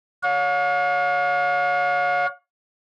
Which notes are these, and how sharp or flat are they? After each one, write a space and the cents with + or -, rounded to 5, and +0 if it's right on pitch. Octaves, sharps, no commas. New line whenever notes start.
C#5 +30 F5 +45